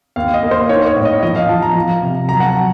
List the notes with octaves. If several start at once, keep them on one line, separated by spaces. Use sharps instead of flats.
D#2 F5
D#5
A#3
C5
D#4 C#5
C#5
A2
D#5
F3 D#5
F5
F3 A5
A#5
F3
C3
F#3 A#5
F#5
A5
F#3